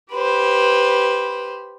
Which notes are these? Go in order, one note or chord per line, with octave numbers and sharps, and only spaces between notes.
G4 B4 C5